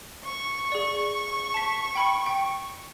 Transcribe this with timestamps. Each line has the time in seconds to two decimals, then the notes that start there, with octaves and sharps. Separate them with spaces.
0.25 C#6
0.72 G#4 D5
1.54 A5 B6
1.95 G5 B5 C#7
2.26 G5